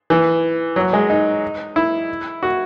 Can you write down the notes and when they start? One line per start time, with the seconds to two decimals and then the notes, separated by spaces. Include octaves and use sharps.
0.10 E3
0.76 F#3
0.93 G#3
1.10 D#4
1.76 E4
2.43 F#4